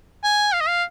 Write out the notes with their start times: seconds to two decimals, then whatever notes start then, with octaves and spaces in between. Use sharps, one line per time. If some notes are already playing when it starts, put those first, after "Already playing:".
0.24 G#5
0.53 F5
0.61 D#5
0.68 F5